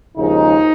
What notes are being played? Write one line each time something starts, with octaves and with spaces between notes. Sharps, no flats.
D#2 C#3 F3 G#3 D#4